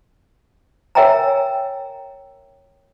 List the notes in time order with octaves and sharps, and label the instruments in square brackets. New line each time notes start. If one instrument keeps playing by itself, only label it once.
[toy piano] A#4 C#5 E5 G5 G#5 A#5